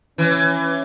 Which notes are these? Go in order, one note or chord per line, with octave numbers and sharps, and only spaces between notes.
E3 C#4